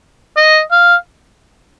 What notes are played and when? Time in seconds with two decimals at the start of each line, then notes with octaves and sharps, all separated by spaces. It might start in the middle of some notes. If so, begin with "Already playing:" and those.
0.37 D#5
0.71 F5